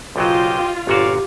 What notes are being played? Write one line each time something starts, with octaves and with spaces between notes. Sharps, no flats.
B1 C#3 F#3 F4 G4 C5 D#5
G1 A#2 F#4 G4 C#5 D5 F5